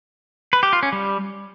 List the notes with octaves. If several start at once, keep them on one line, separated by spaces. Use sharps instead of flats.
B4
G4
F4
C#4
G3